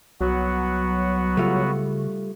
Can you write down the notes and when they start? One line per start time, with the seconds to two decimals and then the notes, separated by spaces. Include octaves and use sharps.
0.21 C2 F#3 B3 F#4
1.37 C#3 G3 A3 F4